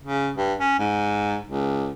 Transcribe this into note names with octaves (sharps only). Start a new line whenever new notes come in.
C#3
G2
C#4
G#2
C#2